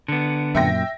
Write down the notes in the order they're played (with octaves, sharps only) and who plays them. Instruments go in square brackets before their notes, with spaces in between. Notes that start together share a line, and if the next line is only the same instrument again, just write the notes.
[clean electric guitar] D3 B3
[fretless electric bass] F#2 A#2 [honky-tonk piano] E5 G5 A#6